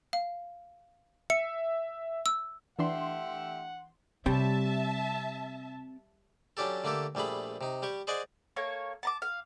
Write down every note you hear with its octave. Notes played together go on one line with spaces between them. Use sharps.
F5
E5 C#7
E6
E3 A3 D4 G4 E5 F#5 C6
C3 G3 C4 C#5 E5 G5 A5
F#3 C#4 D4 G4 A4
D3 A3 A#3 G4 A4
A#1 G3 A3 G#4 B5
C3 D#4
G3 G4 C#6
G#4 C5 D5 D#5 F#5 G#5
A#3 A4 C#5
A5 A#5 D6
F5